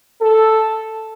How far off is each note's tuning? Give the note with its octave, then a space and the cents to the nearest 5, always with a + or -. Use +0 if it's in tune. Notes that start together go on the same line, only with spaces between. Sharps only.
A4 +0